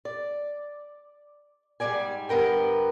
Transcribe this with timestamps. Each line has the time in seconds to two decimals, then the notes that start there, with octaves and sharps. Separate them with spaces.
0.05 D5
1.80 G#2 D#3 G3 D5 G#5
2.29 G2 B3 A#4 G5